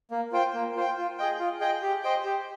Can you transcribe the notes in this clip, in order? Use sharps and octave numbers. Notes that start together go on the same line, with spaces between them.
A#3
F4 C5 G5
A#3
F4 C5 G5
F4
G#4 D#5 G5
F4
G#4 D#5 G5
G4
C5 D#5 G5
G4